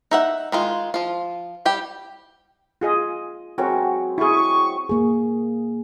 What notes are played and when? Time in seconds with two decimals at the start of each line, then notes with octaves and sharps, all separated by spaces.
0.11 D#4 E5 F#5
0.52 D#3 G#3 F4
0.94 F3 F4
1.65 G3 G4 G5
2.81 F4 G#4 D#5
3.58 F#3 G#3 C4 F#4 A#4
4.18 E4 G#4 C#6
4.89 A#3 G#4